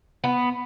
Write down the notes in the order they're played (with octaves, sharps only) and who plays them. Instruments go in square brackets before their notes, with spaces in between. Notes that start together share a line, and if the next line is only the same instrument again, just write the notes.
[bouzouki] B3